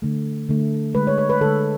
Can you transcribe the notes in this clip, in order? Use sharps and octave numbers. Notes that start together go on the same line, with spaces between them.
D3 A3
D3 A3
D3 G#3 B4
C#5
C#5
B4
D3 G#3 A4